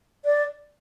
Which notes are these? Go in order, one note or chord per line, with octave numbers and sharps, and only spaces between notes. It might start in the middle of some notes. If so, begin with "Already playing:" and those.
D5